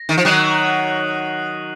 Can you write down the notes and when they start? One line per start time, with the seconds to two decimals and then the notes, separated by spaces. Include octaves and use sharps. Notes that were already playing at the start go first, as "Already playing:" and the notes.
Already playing: A#6
0.09 D#3
0.18 F3
0.25 D#3 F#3 D#6 F#6 C7 D#7 F#7